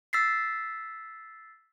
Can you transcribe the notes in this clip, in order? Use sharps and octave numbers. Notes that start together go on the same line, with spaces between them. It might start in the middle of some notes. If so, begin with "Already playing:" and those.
E6 A6 B6 C7